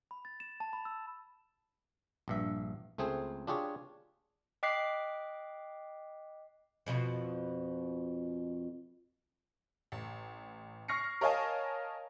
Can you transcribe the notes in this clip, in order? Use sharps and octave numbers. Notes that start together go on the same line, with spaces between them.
B5
A6
E7
A5
B5
E6
A#1 G2 E5
C#2 A3 C4 G#4 C5
D4 F4 G4 G#4 C#5
D#5 G5 D6 F#6 B6 C7
F2 B2 F3
A1
C#6 F6 A#6 C7 C#7
A#4 C#5 D#5 F5 G#5 A5